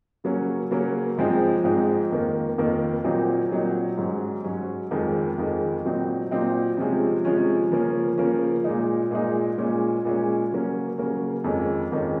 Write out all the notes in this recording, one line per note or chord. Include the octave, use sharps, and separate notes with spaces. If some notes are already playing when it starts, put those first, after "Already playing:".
C#3 F#3 A#3 C#4
C#3 F#3 A#3 C#4
G#2 F3 G#3 C4 D#4
G#2 F3 G#3 C4 D#4
F2 D#3 A#3
F2 D#3 A#3
A#2 F#3 C4 D#4
A#2 F#3 C4 D#4
G#2 F#3 C#4
G#2 F#3 C#4
F2 D#3 G#3
F2 D#3 G#3
A#2 F#3 C4 D#4
A#2 F#3 C4 D#4
C3 F3 G#3 C#4
C3 F3 G#3 C#4
C#3 F3 A#3 C#4
C#3 F3 A#3 C#4
A#2 G#3 D#4
A#2 G#3 D#4
A#2 G#3 C#4
A#2 G#3 C#4
C#3 F#3 A#3 C#4
C#3 F#3 A#3 C#4
F2 D#3 G#3 C#4
F2 D#3 G#3 C#4